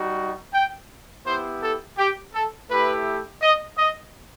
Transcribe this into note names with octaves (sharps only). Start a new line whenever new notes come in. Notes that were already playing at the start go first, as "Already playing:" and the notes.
Already playing: G3 D#4 F#4
G5
B3 E4 G4 C5
A4
G4
A4
A3 E4 G4 B4
D#5
D#5